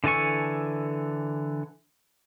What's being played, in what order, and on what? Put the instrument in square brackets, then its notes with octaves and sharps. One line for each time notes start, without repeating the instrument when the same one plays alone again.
[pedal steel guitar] D3 E3 A4 G#5 C#6